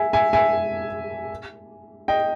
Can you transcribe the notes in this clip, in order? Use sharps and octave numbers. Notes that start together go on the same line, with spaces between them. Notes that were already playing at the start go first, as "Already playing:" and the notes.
Already playing: E5 G#5
E5 G#5
E5 G#5
D#5 G5